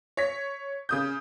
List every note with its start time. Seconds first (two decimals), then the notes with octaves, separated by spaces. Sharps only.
0.17 C#5 B6
0.89 C#3 D#6 G6